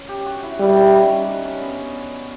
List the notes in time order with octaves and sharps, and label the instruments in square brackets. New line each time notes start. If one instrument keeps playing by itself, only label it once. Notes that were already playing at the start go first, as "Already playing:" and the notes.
Already playing: [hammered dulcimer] C#4
G4
F#4
E4
[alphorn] G3 [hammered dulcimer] E4
[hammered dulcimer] D#4
C#4
C#4
D4
C#4
B3